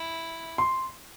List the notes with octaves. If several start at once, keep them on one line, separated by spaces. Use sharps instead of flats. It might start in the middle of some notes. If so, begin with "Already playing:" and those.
Already playing: E4
C6